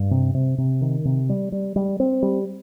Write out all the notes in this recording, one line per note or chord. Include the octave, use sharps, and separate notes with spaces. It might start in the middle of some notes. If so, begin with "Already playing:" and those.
Already playing: G2
C3
C3
C3
D#3
C3
G3
G3
G3
C4
G3